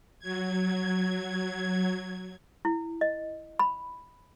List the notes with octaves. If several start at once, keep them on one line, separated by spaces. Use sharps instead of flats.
F#3 G#6
E4
D#5
B5